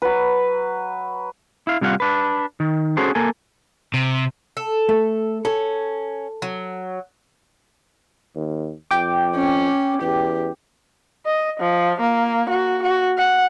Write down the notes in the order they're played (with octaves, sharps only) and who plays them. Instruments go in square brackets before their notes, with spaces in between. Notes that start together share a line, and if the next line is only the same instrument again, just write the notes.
[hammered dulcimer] F#3 B4
[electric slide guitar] E4 F5
C3 G3 F4 F5 F#5
D4 B4
D#3
C#4 F#4 G#4 A4 C5
A#3 A4 G#5
[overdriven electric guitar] C3
[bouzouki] A4
[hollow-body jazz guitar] A3
[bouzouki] C#4 [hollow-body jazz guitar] A4
[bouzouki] F#3
[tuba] D#2
[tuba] F2 [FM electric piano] G5 D6
[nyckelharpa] C#4
[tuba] E2 [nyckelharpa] G4
[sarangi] D#5
F3
A#3
F#4
F#4
F#5